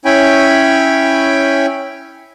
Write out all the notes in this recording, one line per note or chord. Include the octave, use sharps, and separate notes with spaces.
C#4 E4 C#5 G5 G#5 B5